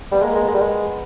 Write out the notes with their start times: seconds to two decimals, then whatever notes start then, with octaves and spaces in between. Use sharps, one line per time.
0.12 G3 B3
0.22 G#3 A#3
0.35 G#3
0.41 B3
0.48 G#3
0.55 G3
0.62 G#3